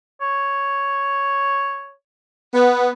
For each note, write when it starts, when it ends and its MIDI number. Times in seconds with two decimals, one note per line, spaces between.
0.21 1.93 73
2.54 2.90 59